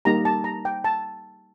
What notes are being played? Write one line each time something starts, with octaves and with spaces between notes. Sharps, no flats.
G3 A#3 D#4 G4 A#5
A5
A#5
G5
A5